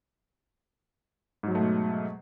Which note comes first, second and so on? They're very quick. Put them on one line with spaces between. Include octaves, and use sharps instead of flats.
G#2 F#3 G#3 A3 B2